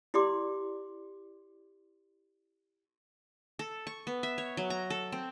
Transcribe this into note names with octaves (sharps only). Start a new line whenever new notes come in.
E4 G4 D5 C6 D6
A4
C#6
B3
E5
C#5
F#3
A#5
A4
C4